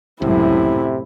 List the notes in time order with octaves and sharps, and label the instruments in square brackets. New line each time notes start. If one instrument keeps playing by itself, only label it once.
[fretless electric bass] C#2 [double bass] F#2 A2 [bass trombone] C3 [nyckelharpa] E4